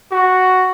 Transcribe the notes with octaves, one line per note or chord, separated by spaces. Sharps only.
F#4